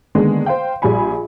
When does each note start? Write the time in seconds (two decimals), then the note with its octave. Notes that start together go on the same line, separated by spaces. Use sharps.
0.15 D3 D#3 G#3 A#3 B3
0.46 C5 F5 G5
0.82 A#1 G3 G#4 G#5 B5